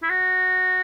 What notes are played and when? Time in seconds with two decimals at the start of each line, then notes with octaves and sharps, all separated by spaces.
0.03 E4
0.10 F#4